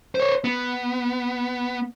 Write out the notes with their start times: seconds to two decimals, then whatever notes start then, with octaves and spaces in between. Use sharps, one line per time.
0.15 C5 C#5
0.44 B3